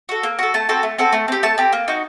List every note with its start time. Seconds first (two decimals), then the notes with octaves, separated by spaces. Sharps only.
0.09 F#4 A4
0.23 A#3
0.39 F#4 A4
0.54 A3 A5
0.69 C4 F#4 A4
0.83 A3
0.98 C4 F#4 A4
1.13 A3
1.28 C4 G4
1.43 A3 A5
1.58 C4 G4
1.73 A#3
1.88 D#4 F#4